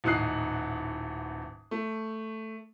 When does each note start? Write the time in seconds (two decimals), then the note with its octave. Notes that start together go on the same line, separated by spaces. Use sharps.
0.04 D#1 A1 D#4 D#6 F#6 C7
1.71 A3